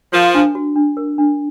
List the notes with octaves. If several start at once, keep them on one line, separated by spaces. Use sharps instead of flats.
F3 A#4
D4
F#4
D4
A#4
D4